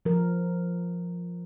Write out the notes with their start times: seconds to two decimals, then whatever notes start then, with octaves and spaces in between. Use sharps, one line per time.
0.05 F3 A#4